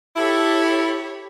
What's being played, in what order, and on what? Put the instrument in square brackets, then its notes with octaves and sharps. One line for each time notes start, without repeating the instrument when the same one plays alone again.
[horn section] E4 A4 [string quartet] G4 C#5 B5